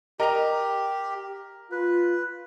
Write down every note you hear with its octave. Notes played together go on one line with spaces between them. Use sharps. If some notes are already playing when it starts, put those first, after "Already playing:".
G4 A#4 D#5 A#5
F4 B4